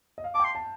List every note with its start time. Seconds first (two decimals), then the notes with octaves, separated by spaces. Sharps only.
0.18 D#5
0.24 F5
0.34 A5 D6
0.40 G5 C6
0.55 A5